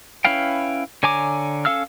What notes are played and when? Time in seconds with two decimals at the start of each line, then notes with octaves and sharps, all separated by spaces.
0.24 C#4 E4 B4 F5 G5
1.03 D3 C#5 G#5 A#5 D6
1.65 C#4 A4 F5 E6 F6